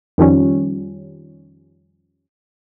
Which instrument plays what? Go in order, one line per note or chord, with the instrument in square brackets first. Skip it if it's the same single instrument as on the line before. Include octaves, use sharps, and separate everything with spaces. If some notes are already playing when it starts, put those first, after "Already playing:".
[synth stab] F2 D#3 F3 G3 C#4